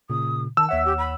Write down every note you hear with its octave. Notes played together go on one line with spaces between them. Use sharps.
A#2 C#3 D#6
D#3 A5 E6
D#2 C#5 E5 F#5
G4
B5